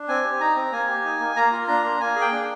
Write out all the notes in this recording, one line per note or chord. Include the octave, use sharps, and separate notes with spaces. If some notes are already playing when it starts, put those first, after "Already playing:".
Already playing: D4
C4 G#5
G4
D#4 A#5
C4
A#3 G#5
G4
D#4
A#3
A#3 A#5
F4
D4 A#5
A#3
A#3 G#5
G#4
G5
D4